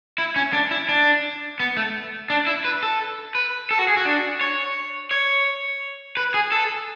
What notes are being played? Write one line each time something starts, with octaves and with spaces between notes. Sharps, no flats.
E4
C#4
D4
E4
D4
B3
A3
D4
E4
B4
A4
B4
A4
F#4
G#4
F#4
D4
C#5
C#5
B4
G#4
A4